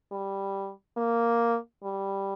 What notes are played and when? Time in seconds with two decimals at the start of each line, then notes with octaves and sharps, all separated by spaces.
0.12 G3
0.97 A#3
1.83 G3